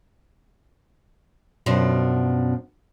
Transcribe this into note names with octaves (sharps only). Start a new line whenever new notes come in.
F#2 B2 F3 D4